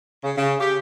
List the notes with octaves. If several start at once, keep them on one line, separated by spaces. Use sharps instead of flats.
C#3
C#3
G4